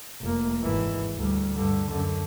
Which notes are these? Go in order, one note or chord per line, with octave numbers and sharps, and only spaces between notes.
F1 A#3
G#1 E3
D2 G3
G2 D3
F#2 D3